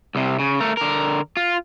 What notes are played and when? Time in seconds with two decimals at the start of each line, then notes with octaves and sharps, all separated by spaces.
0.15 C2 C3
0.39 C#3
0.60 A3 A#4
0.77 D3 A#4
1.37 F4